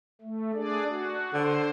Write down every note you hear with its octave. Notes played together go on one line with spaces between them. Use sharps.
A3
D4 G#4 D5
F#4
D3 C5